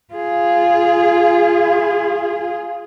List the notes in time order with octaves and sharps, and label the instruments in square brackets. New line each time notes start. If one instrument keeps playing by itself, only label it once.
[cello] F4 G#4